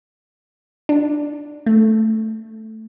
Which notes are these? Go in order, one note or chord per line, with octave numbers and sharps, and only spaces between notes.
D4
A3